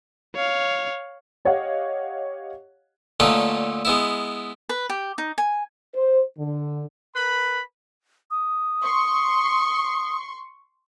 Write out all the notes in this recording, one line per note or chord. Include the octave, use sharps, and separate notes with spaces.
C#5 F5
G4 C#5 D#5 F5 F#5
A#2 D3 A3 C#4 D#4 B4
G#3 B3 E4
B4
G4
D#4
G#5
C5
D3
A#4 B4 B5
D#6
C6 C#6